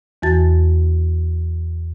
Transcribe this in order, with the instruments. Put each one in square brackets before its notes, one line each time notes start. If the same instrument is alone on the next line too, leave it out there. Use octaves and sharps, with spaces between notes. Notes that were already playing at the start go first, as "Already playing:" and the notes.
[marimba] E2 E3 F#4 A5 A6